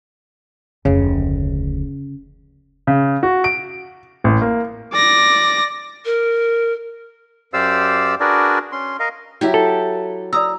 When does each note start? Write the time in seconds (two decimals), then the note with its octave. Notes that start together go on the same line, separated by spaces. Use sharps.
0.85 F1 D2 C#3
2.87 C#3
3.23 F#4
3.44 D7
4.24 A1
4.41 A#3
4.93 D5 A#6
6.05 A#4
7.53 F#2 G4 C5 D5 F5 E6
8.20 D4 F#4 G#4 A#4 B4 D5
8.72 C#4 C6
9.00 A#4 D#5 F5
9.41 F#3 E4 G4
9.54 A4
10.33 D5 A#5 D#6 E6